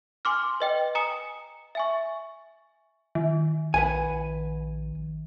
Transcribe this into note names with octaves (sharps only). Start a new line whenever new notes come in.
G#5 C6 D6 F6
B4 D#5 G5
G#5 A#5 D#6 C#7
E5 G#5 C#6
D#3
A#1 B4 F#5 G#5